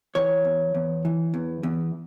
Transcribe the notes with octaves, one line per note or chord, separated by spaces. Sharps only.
E3 C#5
E2
E2
E3
E2
E2